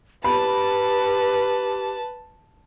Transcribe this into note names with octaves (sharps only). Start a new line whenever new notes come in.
G4 B4 A5 B5